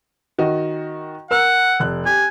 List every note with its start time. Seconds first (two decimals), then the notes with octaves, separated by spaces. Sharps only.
0.38 D#3 F#4 D#5
1.31 A#4 F#5 E6
1.80 F1 F#6
2.06 G4 G#5